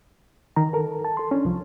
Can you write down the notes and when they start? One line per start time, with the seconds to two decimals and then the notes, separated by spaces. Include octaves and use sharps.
0.56 D#3 A#5
0.73 A4 A#4
1.05 A5
1.17 A4 C6
1.31 C#4 D4
1.45 C2 F3